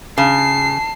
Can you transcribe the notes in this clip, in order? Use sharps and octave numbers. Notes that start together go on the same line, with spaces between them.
C#3 A5 C7